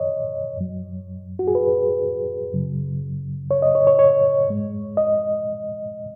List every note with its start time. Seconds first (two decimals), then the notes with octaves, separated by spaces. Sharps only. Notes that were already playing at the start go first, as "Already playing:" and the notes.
Already playing: F#2 D#3 C#5 D#5
0.57 F#2 F#3
1.39 F#4
1.47 G#4
1.55 B4
2.52 F#2 C#3 F#3
3.51 C#5
3.62 D#5
3.75 C#5
3.87 C#5
3.99 C#5
4.48 G#2 G#3
4.97 D#5